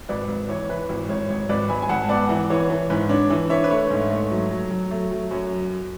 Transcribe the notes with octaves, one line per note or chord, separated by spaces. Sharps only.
G#1 B4 D5
G#1
E3 C#5
E3 B4
G#1
G#1 C#5
G#1 C#5
G#1 B4 D5
G#1 G#5 B5
G#5
G#1 F#5 A5
B3 D5 F#5
E3
E3 C#5
E3
G#2 B4
D4 C#5
E3
D4 C#5 E5
B4
A3 C#5
G#2
A3
F#3
F#3
F#3
A3
F#3
F#2 C#5